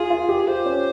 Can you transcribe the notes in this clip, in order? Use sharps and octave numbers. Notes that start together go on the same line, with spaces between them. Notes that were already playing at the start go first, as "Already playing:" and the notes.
Already playing: F4 G#4
F4
G4
F4 C5
C#4